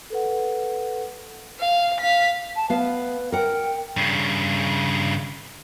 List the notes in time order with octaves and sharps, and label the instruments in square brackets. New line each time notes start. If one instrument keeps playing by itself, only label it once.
[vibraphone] A4 B4 F#5
[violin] F5
F5 B6
[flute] A5
[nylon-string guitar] B3 F5 [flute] B4
[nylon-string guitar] A#4 F#5 [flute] G5
[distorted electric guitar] G2 C#3